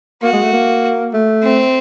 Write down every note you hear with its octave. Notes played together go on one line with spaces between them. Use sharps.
A#3 F#4
G#3
A3
A#3
A3
C4